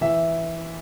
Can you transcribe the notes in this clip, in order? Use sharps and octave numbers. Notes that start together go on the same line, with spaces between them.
E3 E5